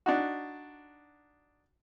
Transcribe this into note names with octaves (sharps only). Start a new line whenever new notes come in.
D4 D#4 F#4